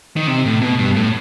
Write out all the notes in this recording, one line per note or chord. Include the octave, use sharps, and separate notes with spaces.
D#3
C3
A2
B2
G2
A2